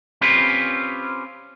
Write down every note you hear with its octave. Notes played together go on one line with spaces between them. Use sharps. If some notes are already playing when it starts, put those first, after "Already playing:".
C4 C#4 F4 G4 B4